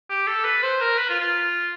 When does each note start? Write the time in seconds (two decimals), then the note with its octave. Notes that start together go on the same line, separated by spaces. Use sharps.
0.10 G4
0.27 A4
0.45 B4
0.63 C5
0.81 A#4
0.98 B4
1.10 F4
1.21 F4